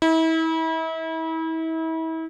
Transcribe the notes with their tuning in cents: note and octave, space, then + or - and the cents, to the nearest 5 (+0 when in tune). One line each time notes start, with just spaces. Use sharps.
E4 -35